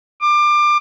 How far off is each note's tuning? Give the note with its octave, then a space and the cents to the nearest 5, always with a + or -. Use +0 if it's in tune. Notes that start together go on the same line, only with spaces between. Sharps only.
D6 +25